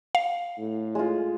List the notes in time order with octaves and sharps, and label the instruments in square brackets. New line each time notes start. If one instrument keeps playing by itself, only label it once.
[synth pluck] F5
[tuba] A2
[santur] G#3 F4